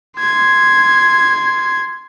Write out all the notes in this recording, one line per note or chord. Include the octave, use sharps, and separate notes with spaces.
C6 G#6